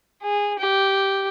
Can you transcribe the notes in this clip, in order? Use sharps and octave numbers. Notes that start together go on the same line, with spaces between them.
G#4
G4